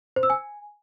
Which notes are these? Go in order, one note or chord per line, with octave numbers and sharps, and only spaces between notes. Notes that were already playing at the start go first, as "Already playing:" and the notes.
C5
E6
G#5